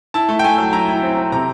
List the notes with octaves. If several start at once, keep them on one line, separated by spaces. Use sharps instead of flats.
E4 A5
A3
G5
A3 G#5
F#3
E4 A#5
E4
C4
C4
C3 A#5